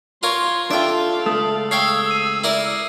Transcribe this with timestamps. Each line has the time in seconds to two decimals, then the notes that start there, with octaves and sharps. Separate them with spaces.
0.23 F4 A#4 C#5 C6
0.71 D4 F4 A4 E5 F5 G5
1.26 C#2 A3 D#6
1.71 C#5 F5 G5 E6 C7
2.08 D#6 D#7
2.44 E4 A#4 D5